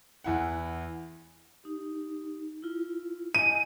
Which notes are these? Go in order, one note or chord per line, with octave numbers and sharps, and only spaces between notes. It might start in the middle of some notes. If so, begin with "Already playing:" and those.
E2 E4 F#5
D#4 G4
E4 F4
D#5 G#5 D#7